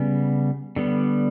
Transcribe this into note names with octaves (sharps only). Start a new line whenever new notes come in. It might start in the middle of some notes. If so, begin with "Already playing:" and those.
Already playing: C#3 G3 B3
D3 G3 B3